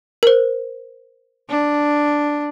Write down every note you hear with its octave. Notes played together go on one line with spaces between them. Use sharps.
A#4 C5
D4